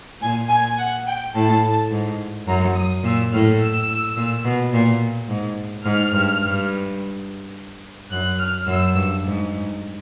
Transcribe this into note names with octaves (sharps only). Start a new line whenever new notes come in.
A#2 G#5
G#5
F#5
G5
A2 A5
G#2
F#2 A#5
D#6
A#2 E6
A2 F6
E6
A#2
B2
A#2
G#2
G#2 F6
G2
G2
F#2 F#6
F6
F#2 E6
G2
G#2